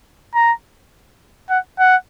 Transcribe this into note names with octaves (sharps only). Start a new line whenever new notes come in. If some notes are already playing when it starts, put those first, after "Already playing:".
A#5
F#5
F#5